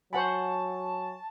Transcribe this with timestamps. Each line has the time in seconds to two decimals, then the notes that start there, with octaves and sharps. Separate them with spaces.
0.13 F#3 C5 F#5 G#5 A5 B5 C#6